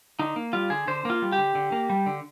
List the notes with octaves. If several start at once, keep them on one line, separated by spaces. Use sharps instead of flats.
D3 D#4
A#3
G3 F4
D3 G#4
D3 C5
A#3 F4
G3
G4
D3
D3
A#3
G3
D3